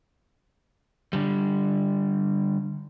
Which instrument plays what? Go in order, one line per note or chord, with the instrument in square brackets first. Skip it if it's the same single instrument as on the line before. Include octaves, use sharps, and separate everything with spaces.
[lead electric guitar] D3 G3